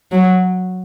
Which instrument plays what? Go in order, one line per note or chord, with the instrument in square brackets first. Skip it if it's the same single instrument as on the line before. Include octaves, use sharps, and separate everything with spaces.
[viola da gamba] F#3